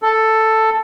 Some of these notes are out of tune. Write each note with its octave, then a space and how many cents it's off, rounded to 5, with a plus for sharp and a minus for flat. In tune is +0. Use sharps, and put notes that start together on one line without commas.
A4 +5